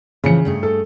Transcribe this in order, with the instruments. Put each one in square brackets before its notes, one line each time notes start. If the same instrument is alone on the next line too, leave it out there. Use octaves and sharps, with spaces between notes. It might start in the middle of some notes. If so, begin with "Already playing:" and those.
[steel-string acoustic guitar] A2 E3 F3 [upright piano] C#3 C#7
[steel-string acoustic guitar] G2 A3 G#4
[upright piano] A4